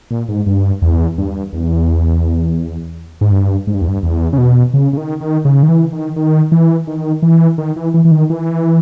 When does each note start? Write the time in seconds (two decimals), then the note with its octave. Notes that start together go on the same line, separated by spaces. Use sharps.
0.11 A#2
0.29 G#2
0.46 G2
0.82 E2
1.18 G2
1.53 E2
3.21 G#2
3.31 G2
3.67 G#2
3.74 G2
3.81 E2
3.88 G2
4.03 E2
4.33 C#3
4.38 B2
4.74 C#3
4.93 C#3
4.97 D#3
5.21 D#3
5.45 C#3
5.63 D#3
5.69 E3
5.92 D#3
6.16 D#3
6.52 E3
6.87 D#3
7.22 E3
7.58 D#3
7.76 E3
7.94 E3
8.05 E3
8.11 D#3
8.30 E3